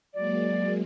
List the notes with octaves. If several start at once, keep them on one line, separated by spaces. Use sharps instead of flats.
F#3 G#3 A#3 D5